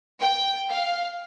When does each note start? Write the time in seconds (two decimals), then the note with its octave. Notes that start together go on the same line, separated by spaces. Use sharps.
0.20 G5
0.69 F5